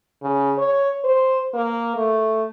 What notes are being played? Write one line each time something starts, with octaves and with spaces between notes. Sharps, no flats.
C#3
C#5
C5
A#3
A3